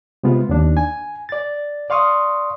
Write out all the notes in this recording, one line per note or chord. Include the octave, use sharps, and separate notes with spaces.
C3 G#3 B3 F4
D#2 D4
G#5
D5 A6
D5 F5 C6 C#6 D#6